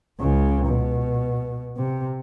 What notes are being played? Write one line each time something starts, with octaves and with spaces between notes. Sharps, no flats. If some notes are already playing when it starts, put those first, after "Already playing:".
C#2 C#3
B2
C3